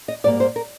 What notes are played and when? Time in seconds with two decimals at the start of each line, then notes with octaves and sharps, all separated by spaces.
0.08 D#5
0.24 G#2 G3 A#3 D5
0.40 C5
0.56 A#4